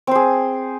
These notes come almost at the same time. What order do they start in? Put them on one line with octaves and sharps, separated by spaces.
C4 C5 G#4